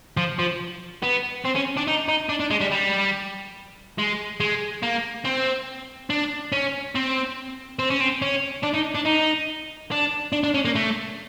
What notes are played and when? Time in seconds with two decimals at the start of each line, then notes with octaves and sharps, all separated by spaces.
0.17 F3
0.39 F3
1.02 B3
1.45 C4
1.55 C#4
1.77 D4
1.87 D#4
2.08 D#4
2.29 D4
2.40 D4
2.50 G#3
2.61 G3
2.71 G3
3.98 G#3
4.40 G#3
4.83 A#3
5.25 C4
6.10 D4
6.52 C#4
6.95 C4
7.79 C4
7.90 C#4
8.01 C4
8.22 C#4
8.64 D4
8.75 D#4
8.95 D4
9.06 D#4
9.91 D4
10.33 D4
10.43 D4
10.54 C#4
10.65 A#3
10.75 A3